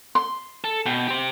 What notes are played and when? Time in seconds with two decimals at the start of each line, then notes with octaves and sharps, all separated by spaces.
0.15 C6
0.64 A4
0.86 B2 G5
1.08 G4 C5